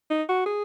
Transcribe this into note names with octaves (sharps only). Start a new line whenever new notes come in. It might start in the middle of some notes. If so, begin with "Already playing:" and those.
D#4
F#4
G#4